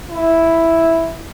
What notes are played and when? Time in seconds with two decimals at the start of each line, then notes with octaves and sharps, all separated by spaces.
0.10 E4